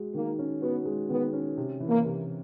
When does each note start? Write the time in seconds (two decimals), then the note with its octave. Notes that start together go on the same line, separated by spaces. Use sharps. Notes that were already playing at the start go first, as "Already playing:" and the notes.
Already playing: G#3 F#4
0.14 D#3 A#3
0.39 C#4
0.62 B3 F#4
0.85 G#3
1.10 D#3 B3
1.33 C#4
1.57 C3
1.80 E3
1.89 A#3
2.04 C3